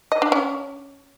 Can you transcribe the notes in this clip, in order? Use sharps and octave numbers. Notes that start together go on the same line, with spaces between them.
D#5
D4
C#4